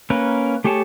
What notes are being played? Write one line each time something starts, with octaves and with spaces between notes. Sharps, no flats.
A#3 C#4 A#4 B4
A3 G4 G#4 C#5 A5